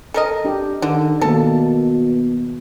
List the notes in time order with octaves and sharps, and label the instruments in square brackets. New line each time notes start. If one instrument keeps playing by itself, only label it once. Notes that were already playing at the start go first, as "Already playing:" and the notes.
[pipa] A4 A#4 D#5
[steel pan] D4 G4
[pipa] D3 [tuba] D#3
[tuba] B2 [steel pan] D#3 A#3 [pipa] A4 A5